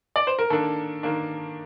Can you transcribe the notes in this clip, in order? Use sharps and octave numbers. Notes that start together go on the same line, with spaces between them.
D5
C5
A#4
D#3 A#3 D4 A4
D#3 A#3 D4